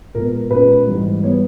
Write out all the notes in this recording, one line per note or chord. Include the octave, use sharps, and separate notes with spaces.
A#2 G#3 B3 A#4
A#2 G#3 C#4 B4
G#2 E3 G3
G3 B3 C#5